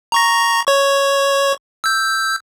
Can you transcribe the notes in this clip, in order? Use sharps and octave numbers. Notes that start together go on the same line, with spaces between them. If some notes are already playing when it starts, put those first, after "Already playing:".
A#5 C#6 A#6
C#5 C#6
E6 G6